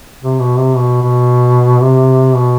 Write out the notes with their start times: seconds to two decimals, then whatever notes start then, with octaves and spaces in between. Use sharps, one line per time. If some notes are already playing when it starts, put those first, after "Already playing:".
0.22 C3
0.40 B2
0.57 C3
0.76 B2
1.02 B2
1.81 C3
2.35 B2